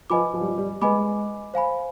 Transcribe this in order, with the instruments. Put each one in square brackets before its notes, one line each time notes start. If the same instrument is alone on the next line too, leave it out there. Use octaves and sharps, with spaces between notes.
[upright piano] F3 [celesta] B4 D#5 G#5 B5 D6
[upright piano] F3
G3
F3
G3
[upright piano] G#3 [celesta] B4 D#5 G#5 B5 D6
[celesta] C5 F5 G#5 B5